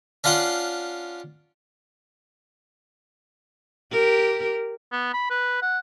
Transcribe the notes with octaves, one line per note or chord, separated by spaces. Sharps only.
C#4 D4 F4 F#5 C6
G4 A#4
B3
B5
B4
F#5